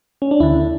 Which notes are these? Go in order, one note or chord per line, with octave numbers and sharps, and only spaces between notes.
C#4
D4
D2 D3 E4